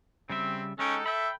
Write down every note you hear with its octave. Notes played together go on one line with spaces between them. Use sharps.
C#3 G3 C4 E5
G#3 C#4 D#4 A4 G5
E5 G5 B5